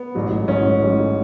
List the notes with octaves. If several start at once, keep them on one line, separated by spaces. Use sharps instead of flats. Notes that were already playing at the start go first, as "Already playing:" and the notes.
Already playing: B3
A1 G#2 F#3
A1 G#2 F#3 C#4
A1 G#2 F#3